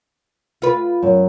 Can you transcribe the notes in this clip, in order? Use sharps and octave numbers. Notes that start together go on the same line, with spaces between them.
F4 B4
F#2